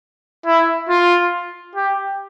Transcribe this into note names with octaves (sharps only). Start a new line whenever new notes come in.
E4
F4
G4